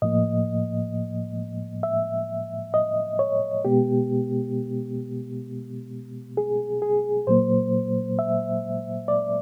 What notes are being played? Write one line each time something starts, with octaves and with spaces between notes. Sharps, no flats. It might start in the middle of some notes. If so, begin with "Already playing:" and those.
A2 F3 A#3 D#5
E5
D#5
C#5
B2 G#3 B3 G4
G#4
G#4
A#2 F#3 A#3 C5
E5
D5